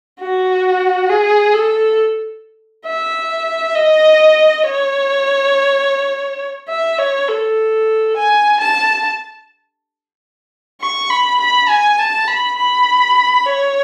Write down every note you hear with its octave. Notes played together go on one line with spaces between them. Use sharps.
F#4
G#4
A4
E5
D#5
C#5
E5
C#5
A4
G#5
A5
C#6
B5
B5
G#5
A5
B5
B5
C#5